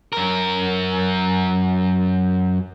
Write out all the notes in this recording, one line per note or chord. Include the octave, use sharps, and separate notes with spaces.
F#2 A#4